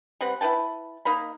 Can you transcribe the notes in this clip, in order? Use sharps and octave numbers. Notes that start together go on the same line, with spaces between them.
G3 C4 B4 F#5
E4 B4 G5 A5
A#3 D#4 A#4 B5